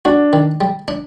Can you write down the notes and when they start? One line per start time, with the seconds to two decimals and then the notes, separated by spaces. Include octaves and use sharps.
0.05 D4 F#4
0.33 D#3
0.61 G3
0.88 D4